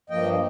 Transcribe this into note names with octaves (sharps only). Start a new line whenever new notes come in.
G2 F3 A#3 D#5 G5